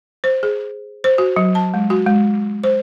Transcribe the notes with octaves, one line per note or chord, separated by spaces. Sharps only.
C5
G#4
C5
F#4
F#3
A5
G#3
F#4
G#3
C5